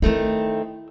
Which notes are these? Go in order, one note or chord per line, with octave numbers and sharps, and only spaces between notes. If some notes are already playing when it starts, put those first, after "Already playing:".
D#3 A3 C4 D#4 E4